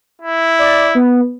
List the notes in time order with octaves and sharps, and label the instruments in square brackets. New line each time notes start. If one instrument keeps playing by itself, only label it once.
[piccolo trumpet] E4
[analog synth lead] D5
B3